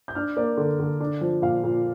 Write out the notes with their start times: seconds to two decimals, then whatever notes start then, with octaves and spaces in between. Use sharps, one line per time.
0.08 G6
0.15 D4 F6
0.37 A#3 D5
0.57 D3
0.80 D3
1.00 D4
1.21 F3
1.42 A#2 F5
1.64 A#2